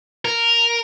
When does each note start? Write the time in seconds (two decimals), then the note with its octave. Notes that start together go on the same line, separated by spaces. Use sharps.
0.25 A#4